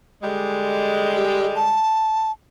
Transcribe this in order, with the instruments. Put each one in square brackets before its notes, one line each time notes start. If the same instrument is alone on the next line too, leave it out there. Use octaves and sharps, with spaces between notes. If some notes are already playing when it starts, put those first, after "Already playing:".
[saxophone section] D3 G3 G#3
[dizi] G4
A5